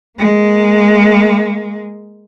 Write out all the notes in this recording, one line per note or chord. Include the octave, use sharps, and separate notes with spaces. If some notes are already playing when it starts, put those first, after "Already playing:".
G#3 A#3